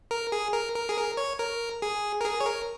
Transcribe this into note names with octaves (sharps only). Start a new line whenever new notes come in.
A#4
G#4
A#4
A#4
G#4
A#4
C#5
A#4
G#4
A#4
G#4
C#5
A#4